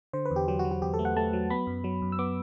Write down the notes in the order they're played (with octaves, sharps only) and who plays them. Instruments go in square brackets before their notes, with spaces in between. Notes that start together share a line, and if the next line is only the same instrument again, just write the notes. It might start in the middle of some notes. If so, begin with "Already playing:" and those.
[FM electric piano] D3 C5
B4
E2
G4
F#3 G4
F#4
F#3
F#4
E2 G4
A4
A3
F#5
A3 A5
F#3
B3 B5
F#2
F#3
F#2
E6
B3 D6